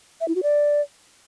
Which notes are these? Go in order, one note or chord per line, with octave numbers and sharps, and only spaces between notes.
E5
E4
F#4
D5